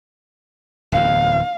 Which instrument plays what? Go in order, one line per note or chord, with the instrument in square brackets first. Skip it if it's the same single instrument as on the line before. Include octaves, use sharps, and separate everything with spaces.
[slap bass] D1 E2 [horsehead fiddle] F5